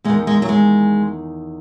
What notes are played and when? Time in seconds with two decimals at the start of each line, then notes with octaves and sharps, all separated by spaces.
0.04 E2 G#3
0.10 D#3
0.27 G#3
0.42 F#3
0.49 G#3